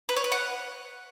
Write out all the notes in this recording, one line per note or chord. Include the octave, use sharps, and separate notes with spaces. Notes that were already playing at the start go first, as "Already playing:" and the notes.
B4
C#5
B4
F#5